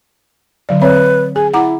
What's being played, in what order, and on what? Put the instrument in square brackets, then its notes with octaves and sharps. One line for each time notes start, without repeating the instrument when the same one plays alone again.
[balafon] D3 F#3 D5
[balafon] C4 C#5 E5 [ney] B4
[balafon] G#4 [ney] G#5
[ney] E4 [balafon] F#5 A#5 D6